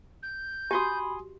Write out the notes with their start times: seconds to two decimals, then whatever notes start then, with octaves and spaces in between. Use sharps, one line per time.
0.23 G6
0.71 F#4 G4 G#5 B5 C6 D#6